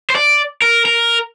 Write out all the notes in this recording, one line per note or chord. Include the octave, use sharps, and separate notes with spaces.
C5
D5
A#4
A#4